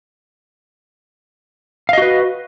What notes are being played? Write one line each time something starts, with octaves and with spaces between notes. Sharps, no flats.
F#4 B4 D#5 F5